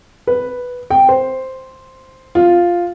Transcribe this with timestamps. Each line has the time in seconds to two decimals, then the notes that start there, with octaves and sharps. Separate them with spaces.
0.27 B4
0.90 G5
1.09 C5
2.35 F4